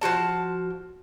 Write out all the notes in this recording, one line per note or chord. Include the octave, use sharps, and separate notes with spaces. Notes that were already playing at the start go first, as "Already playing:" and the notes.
F3 G#3 F#4 A5